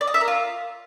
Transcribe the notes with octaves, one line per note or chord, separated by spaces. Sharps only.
D5
D#5
E5
A#4
F4